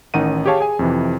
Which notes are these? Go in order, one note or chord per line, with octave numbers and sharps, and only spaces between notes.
A1 D#3 C#4 D#4 F#5 D#7
G4 G#4 C#5 F5 A5
G#4 G#5
F2 C3 E3